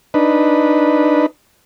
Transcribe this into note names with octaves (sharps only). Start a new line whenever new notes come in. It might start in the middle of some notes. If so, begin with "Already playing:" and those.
D4 D#4 B4